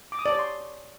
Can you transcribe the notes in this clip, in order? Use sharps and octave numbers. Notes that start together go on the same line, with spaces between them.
D6
D#6
D5
C#5
C6